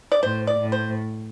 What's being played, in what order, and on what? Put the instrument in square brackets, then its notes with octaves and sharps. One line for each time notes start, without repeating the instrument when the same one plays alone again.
[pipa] D5
[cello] A2 [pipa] C5
[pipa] D5
[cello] A2
[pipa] C5